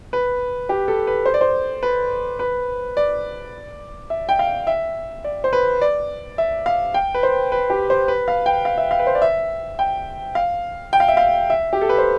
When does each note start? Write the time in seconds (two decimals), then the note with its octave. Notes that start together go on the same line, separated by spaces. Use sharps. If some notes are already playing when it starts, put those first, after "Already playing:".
0.13 B4
0.69 G4
0.88 A4
1.07 B4
1.26 C5
1.34 D5
1.41 C5
1.83 B4
2.39 B4
2.97 D5
4.10 E5
4.29 G5
4.39 F5
4.67 E5
5.24 D5
5.44 C5
5.53 B4
5.81 D5
6.38 E5
6.66 F5
6.94 G5
7.14 B4
7.23 C5
7.52 B4
7.70 G4
7.90 C5
8.08 B4
8.28 F5
8.46 G5
8.65 F5
8.78 E5
8.91 F5
8.99 B4
9.07 C5
9.15 D5
9.22 E5
9.79 G5
10.35 F5
10.93 G5
11.00 F5
11.08 E5
11.17 F5
11.50 E5
11.73 G4
11.81 A4
11.89 B4
11.98 C5